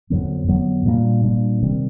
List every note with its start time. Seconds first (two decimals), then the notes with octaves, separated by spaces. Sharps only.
0.10 F2 D3 F#3 B3
0.48 F2 D3 F#3 B3
0.86 A#2 G3 A#3 D4
1.24 A#2 G3 A#3 D4
1.63 C3 D#3 G3 C4